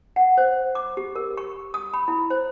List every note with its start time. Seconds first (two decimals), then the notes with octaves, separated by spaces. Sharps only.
0.16 F#5
0.37 C5
0.75 D6
0.97 G4
1.16 A#4
1.37 C#6
1.74 D#6
1.94 B5
2.08 E4
2.30 C5